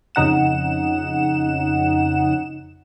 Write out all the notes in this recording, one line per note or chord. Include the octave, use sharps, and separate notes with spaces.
F2 C#3 D#4 F#5 E7